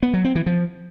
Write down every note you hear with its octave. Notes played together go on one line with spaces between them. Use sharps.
B3
F#3
C4
E3
F3